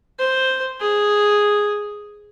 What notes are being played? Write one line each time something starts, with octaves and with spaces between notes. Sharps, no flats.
C5
G#4